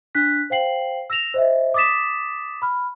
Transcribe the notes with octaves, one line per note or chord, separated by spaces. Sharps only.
D4 F#6 B6
C5 F5 G5 C7 F#7
E6 A#6 E7 F7
C5 D#5 E5
D6 D#6 A6 B6 E7
B5 F6